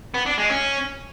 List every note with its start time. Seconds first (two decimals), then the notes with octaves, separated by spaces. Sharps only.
0.14 B3
0.26 D4
0.38 G#3
0.50 C#4